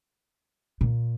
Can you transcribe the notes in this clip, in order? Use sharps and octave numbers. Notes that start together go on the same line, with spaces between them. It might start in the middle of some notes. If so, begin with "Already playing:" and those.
A#2